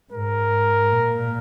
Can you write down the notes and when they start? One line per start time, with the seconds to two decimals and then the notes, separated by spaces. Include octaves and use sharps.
0.12 G#2 A#4
0.92 A#2